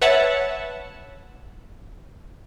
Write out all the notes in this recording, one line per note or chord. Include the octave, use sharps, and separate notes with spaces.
B4 C#5 E5 F#5 A5